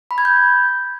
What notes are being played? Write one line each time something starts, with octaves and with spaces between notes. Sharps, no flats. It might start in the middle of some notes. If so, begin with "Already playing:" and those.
B5
G#6
G6